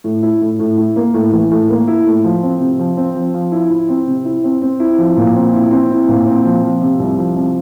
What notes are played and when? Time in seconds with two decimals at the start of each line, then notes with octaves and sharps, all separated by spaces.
0.04 A2
0.23 E4
0.42 A2
0.59 A2
0.77 E4
0.96 A#3
1.14 A2
1.32 E3
1.51 A2
1.70 A#3
1.87 E4
2.06 A2
2.24 F3
2.43 C4
2.60 C3
2.79 F3
2.97 C4
3.15 F3
3.34 F3
3.52 E4
3.70 E4
3.89 C4
4.07 C3
4.25 E4
4.44 C4
4.62 C4
4.80 E4
4.98 F3
5.17 A#2
5.35 C4
5.54 E4
5.72 C4
5.90 E4
6.08 A#2
6.27 C4
6.44 F3
6.63 F3
6.81 C3
6.99 C2
7.18 F3
7.36 C3